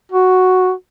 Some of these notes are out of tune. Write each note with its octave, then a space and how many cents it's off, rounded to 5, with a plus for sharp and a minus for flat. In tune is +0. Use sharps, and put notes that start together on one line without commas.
F#4 +0